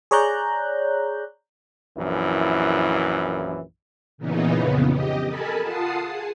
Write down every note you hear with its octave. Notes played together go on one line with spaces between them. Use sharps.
G#4 C#5 D5 A#5 F#6 G6
A#1 F#2 E3 E4
A#2 C#3 E3 B3 D#4
F2 C#3 B3
G4 D#5
A4 A#4 G#5 A5 B5
F4 F#5 A5 D#6 C7
G#4